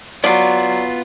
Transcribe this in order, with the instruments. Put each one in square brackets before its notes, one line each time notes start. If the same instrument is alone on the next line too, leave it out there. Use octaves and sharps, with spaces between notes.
[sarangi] F#3 [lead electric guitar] B3 F4 [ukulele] D5